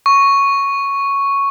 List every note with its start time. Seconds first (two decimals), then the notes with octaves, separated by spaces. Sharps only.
0.06 C#6